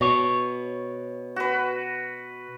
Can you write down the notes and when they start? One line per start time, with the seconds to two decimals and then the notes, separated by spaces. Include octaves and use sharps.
0.01 B2 C#5
1.36 F#4 B4